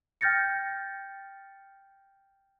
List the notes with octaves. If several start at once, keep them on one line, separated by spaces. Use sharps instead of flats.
G5 F6 G6 A6 A#6 C#7